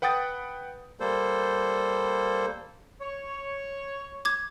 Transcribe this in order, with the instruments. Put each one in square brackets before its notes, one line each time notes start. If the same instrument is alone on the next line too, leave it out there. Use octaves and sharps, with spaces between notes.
[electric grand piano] B4 F#5 G5 D#6 A6
[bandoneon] G3 A#3 A4 C5
[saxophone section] C#5
[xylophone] D6 G#6